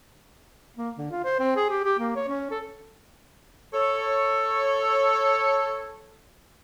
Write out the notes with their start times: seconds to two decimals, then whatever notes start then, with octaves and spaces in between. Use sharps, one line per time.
0.77 A#3
0.98 D3
1.11 F4
1.24 C5
1.40 C4
1.56 G#4
1.69 G4
1.84 G4
1.99 A#3
2.16 C#5
2.28 C#4
2.51 A4
3.73 A4 C#5